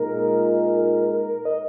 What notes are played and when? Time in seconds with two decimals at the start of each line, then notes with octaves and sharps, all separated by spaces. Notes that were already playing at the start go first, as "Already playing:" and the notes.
Already playing: A#2 G#3 D#4 A#4
1.45 D#5